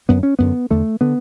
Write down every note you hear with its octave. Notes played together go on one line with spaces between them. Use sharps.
F#2 D3 B3
C#4
F#2 D3 B3
E2 D3 A3
D3 B3